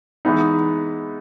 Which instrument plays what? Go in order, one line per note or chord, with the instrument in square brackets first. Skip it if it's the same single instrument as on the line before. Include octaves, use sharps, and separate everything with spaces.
[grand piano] E3 G#3 B3 D#4